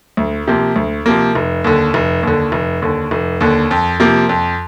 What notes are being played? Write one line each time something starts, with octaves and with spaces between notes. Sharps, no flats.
D2
C3 F3 A#3
D2
C3 F3 A#3
F1
D#2 D3
F1
D#2 D3
F1
D#2 D3
F1
D#2 D3
F2
C3 F3 A#3
F2